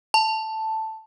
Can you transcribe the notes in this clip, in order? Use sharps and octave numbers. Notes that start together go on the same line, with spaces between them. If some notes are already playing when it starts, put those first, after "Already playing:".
A5